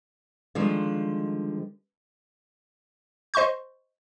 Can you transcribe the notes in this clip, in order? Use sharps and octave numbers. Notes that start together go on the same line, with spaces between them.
D3 D#3 F3 G3 G#3
C5 D#5 C6 C#6 G6